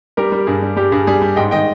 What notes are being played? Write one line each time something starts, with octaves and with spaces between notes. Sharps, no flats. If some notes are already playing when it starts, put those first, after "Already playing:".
G3 G4 A#4
G3
G2 G#4
G3
G3 G4
G2 G#4
G3 G#4
G3
G#2 D#5 G5
D#3 D#5 G5